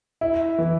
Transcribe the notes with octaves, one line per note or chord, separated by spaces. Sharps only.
E4
E3